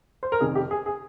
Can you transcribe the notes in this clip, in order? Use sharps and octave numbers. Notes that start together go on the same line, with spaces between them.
C5
A#4
F1 F2 D#3 G#4
G4
G#4
G#4